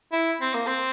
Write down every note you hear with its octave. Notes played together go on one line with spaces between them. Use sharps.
E4
C4
A#3
C4